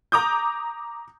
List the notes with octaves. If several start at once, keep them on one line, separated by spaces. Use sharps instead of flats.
A#5 D6 D#6 G6